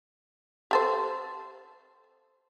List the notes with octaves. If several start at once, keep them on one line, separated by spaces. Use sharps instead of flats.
G4 A4 C5